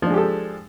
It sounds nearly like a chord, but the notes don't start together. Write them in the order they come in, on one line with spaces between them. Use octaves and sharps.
F3 D4 G#3 G4 A4